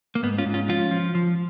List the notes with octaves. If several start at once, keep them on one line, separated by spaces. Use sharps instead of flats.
A#3
G#2 B3
C#4 F4
G#2
C#4 F4
F3 C#4 F4
F3
F3